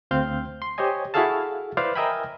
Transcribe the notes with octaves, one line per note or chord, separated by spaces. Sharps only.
D2 C4 F5 C6 G6
C6
G4 C5 C#5 D#5 G#5
E4 F#4 G#4 A4 F5 A5
E4 B4 C5 D5 F5
A#4 D#5 E5 G5 G#5 B5